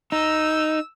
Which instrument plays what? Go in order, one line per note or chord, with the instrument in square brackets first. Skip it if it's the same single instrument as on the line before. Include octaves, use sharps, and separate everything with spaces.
[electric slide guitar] D#4 [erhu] E6